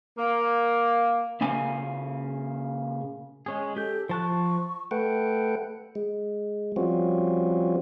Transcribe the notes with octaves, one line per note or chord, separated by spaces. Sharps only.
A#3
A#2 C#3 A#3 G#5
G#3 C#4 G#4
G4 A4 G6
F3 A5 C#6 F#6
A3 A4 B4 F#5 G5
G#3
F3 G3 C4 C#4 F4 F#4